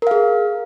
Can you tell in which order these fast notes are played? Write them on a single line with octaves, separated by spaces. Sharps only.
A#4 F5 G#4